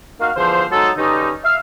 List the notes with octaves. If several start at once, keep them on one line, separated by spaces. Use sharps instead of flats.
A#3 D#4 F#4 F5
E2 D3 F3 C5
F#3 G#3 D#4 A4
G2 D3 C#4 D#4
E5 F5